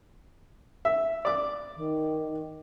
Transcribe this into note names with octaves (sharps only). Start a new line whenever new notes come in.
E5
D5 D6
D#3